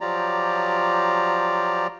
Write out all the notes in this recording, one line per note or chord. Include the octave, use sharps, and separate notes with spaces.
F3 F#3 F4 G4 D5 A#5